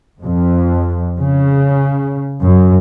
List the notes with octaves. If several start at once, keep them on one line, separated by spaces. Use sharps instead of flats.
F2
C#3
F#2